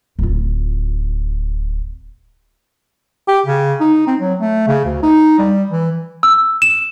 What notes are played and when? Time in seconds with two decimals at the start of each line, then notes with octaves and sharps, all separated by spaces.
0.19 D1 F4
3.28 G4
3.46 C#3
3.80 D#4
4.07 C4
4.20 F#3
4.39 A3
4.67 C#3
4.85 D2
5.03 D#4
5.38 G3
5.70 E3
6.23 E6
6.62 E7